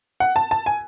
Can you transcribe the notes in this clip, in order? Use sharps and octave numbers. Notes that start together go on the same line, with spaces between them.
F#5
A5
A5
G#5